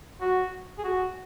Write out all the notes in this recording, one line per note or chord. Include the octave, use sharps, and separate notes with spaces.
F#4
G#4
F#4